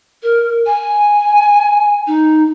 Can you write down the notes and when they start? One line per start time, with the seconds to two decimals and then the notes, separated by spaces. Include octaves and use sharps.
0.22 A#4
0.66 G#5
2.07 D#4